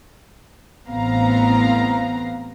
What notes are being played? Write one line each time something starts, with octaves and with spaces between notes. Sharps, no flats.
A1 B3 C4 F5 A#5